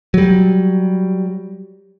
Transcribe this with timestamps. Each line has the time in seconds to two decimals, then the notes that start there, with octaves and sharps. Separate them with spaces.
0.14 F#3 G3